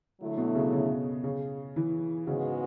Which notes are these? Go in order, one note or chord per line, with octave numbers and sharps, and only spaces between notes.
D3 F#3 A3 E4
B2
C#3
C#3
C#3
E3
G#2 C#3 G#3 B3 F#4